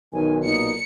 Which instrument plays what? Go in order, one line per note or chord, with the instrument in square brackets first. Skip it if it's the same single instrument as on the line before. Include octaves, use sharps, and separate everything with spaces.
[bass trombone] B1 [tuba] D#3 [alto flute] G#5
[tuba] A#2 [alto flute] D#4 [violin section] C#7